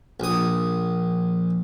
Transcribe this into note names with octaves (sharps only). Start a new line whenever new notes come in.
A#1 D#6